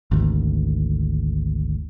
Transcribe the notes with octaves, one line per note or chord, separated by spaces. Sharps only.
G#1 D2